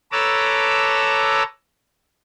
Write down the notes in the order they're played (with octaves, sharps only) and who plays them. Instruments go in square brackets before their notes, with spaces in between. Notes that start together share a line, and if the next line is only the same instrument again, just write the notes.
[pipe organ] A4 B4 C#5 A#5 D6 E6